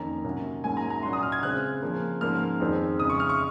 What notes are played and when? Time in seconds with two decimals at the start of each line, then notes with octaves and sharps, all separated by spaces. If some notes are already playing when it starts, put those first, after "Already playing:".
Already playing: F2 D#3 A#3 C#4 A#5
0.24 C3 F#3 A#3 C#4
0.64 G#2 F#3 A#3 C#4 G#5
0.77 A#5
0.90 A#5
1.03 A#2 F#3 C#4 C6
1.13 D#6
1.23 F6
1.32 G#6
1.42 C#3 G#3 C4 F#6
1.82 C#3 F3 A#3 C#4
2.21 G#2 F3 A#3 C#4 F6
2.60 F2 D#3 G#3 C4
2.99 F2 C#3 G#3 D#6
3.10 C#6
3.20 F6
3.29 C#6